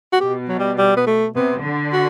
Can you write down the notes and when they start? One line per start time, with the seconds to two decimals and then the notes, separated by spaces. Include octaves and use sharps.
0.13 F#4
0.20 B2 G4
0.48 F#3
0.59 G3
0.78 G3
0.97 B3
1.07 A3
1.35 C3 B3
1.64 D3
1.93 F#4